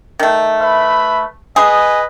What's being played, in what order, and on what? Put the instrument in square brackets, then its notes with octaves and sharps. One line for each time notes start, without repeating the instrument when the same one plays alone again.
[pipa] D#3 A3
[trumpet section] B4 E5 B5
[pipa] G#4 [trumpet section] B4 D#5